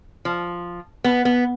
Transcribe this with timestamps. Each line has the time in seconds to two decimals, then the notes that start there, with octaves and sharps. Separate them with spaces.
0.25 F3
1.04 B3
1.25 B3